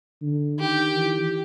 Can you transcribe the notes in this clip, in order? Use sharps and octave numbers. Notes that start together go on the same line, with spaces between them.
D3
D#3 G4
E3